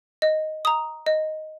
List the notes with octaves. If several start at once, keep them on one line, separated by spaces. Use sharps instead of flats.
D#5
A#5 D#6
D#5